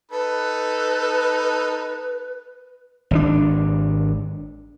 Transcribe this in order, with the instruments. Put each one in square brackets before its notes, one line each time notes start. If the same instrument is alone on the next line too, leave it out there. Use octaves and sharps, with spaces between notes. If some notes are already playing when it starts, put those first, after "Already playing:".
[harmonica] D#4 A4 B5 [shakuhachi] B4
[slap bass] G#1 C#3 D4